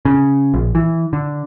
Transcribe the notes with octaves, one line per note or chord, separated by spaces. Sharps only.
C#3
A#1
E3
D3